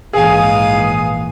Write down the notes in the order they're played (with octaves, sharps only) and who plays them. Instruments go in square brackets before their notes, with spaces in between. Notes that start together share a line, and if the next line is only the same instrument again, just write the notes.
[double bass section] A#1 E3 [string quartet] G#2 F5 D#6 [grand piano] G#4 G#5